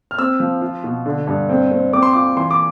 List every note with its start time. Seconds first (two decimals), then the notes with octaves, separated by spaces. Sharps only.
0.11 F6
0.18 C4 E6
0.40 F3
0.62 F4
0.84 B2
1.06 D3
1.27 G2
1.49 C4
1.71 C4
1.93 C4 D6
2.03 C6
2.13 F4 D6
2.37 E3 C6
2.51 D6